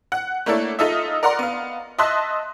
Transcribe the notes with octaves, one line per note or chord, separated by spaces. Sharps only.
F#5 F#6
A3 A#3 D4 E4 A4 C#5
D#4 F4 A4 D#5 E5
A#4 D5 F#5 A#5 C6
B3 F5
D#5 E5 A5 C6 F#6 B6